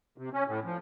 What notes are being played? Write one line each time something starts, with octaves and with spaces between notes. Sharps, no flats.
C3
C#4
A2
F3